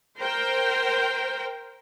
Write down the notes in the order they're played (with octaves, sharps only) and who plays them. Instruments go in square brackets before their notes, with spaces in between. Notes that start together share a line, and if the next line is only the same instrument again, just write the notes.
[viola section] A#4 C5 G5